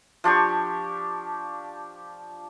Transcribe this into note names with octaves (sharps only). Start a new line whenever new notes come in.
F3 D4 G4 C#6